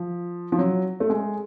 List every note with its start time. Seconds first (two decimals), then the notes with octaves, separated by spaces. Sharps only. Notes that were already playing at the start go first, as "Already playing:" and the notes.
Already playing: F3
0.52 F3
0.58 F#3
1.00 A3
1.10 G#3